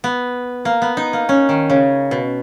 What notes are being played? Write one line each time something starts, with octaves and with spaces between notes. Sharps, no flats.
B3
A#3
B3
D#4
A#3
C#4
D#3
C#3
B2